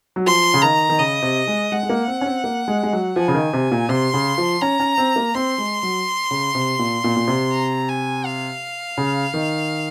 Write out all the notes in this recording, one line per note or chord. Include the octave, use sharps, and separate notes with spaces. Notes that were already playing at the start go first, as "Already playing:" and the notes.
F#3
F3 C6
C#3
D#3 A#5
D#3
C#3 D#5
C3
G#3
G#3 F#5
G#3
A#3
C4
C#4
C4
A#3
G#3
G#3
F#3
F3 G#5
C#3
D#3
C3
A#2
C3 C6
C#3
F3
C#4 A#5
C#4
C4
A#3
C4 C6
G#3
F#3
C#3
C3
A#2
A#2
A#2
C3
A#5
G#5
F5
C#3
D#3